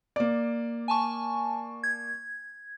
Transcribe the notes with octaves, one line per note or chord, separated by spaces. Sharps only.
A#3 D5
G#5 A5 C#6
G#6